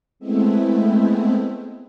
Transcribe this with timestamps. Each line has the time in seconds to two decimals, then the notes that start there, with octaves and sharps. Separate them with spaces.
0.19 G#3 A3 B3 C4 E4